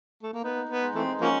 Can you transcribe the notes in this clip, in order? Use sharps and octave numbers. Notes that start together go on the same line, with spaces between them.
A3
A#3
B3 D#4
B3
G#3
E3 A3 C4
F3 A#3 C#4 F#4